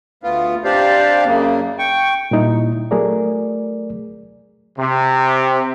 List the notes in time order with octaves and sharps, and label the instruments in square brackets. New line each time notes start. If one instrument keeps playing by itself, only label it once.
[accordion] D2 B3 F4
C3 D4 G4 C5 D5 F5
F#2 C#3 A#3
G5 C#6
[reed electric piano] A#2 G3 D#4 E4
F#3 A3 G#4 A#4 D5
[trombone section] C3